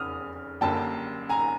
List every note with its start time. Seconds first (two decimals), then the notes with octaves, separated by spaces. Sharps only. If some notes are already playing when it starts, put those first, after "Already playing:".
Already playing: F1 E2 C#3 D#6 F6
0.61 F#1 F#2 D3 G3 A#3 G5 A5
1.29 G#5 A#5